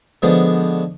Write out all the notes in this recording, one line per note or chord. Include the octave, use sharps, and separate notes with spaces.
D3 F3 G#3 B3 D4 F#4